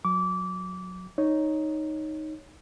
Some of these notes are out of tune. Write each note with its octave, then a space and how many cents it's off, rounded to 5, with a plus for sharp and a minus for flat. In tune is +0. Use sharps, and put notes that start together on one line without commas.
F#3 -20 D6 -20
D#4 +0 C#5 +0